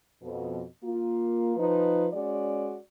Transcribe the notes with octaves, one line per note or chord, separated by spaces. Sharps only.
F2 B2
A#3 F4
F3 D#4 B4
G#3 C#4 F#4 D5